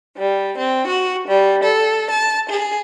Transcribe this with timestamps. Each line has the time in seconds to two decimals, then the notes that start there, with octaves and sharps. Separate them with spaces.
0.16 G3
0.58 C4
0.87 F#4
1.27 G3
1.63 A4
2.10 A5
2.49 G#4